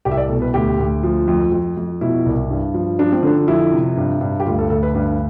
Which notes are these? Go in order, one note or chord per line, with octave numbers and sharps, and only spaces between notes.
C2 G4
E5
D5
B2 A4
B4
D2 G4
D2
F3
F2
F2
F2
B2 E4
C2
G2
F3
F3 D4
C4
D3 D4
F2 E4
C3
G2
G2
G4
D2 F4
A4
D2 A4
B4
G2 B4